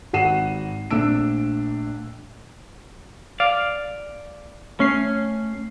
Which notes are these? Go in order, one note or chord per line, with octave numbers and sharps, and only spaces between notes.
G#1 F#4 F#5 C7 D#7 E7
A#1 A3 D4 E6 D7
D5 F5
A3 C#4 C7